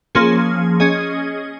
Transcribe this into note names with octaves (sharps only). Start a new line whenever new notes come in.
F3 A#3 C#4 G#4
C#4 G#4 D#5